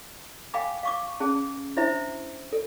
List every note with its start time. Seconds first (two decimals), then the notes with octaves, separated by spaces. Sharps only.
0.54 F5 G5 G#5 B5 D6
0.83 F5 C#6 D6
1.20 C#4 G#4 A5
1.77 D4 E4 C5 E5 B5
2.53 A4